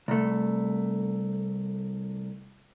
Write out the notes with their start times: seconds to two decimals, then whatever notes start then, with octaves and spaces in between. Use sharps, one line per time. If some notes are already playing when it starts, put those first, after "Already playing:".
0.08 C2 A3